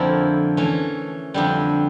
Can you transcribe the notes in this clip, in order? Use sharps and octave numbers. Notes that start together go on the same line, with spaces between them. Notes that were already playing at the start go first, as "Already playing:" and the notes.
Already playing: F2 D3 F3 A#3 E4
E3 A3 C#4
F2 D3 G3